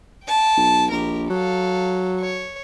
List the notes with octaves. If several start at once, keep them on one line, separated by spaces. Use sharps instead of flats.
G5 A5
B1
A#1 G4 A#4
F#3 A4 F5
C#5